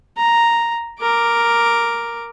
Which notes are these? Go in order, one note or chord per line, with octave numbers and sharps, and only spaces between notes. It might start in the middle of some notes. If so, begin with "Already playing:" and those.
A#5
A#4 D6